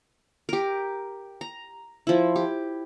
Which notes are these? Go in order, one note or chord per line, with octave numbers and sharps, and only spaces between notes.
G4 A#4
A#5
F3 E4
G4